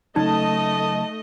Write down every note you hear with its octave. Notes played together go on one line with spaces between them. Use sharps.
C#3 F#3 A3 C#4 D#4 D#5 A5